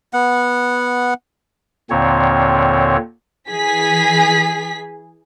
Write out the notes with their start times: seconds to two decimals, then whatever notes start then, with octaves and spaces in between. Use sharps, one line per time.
0.13 B3 F#5
1.90 D#2 A#2 D3 C4 C#5
3.48 E3 G#4 B6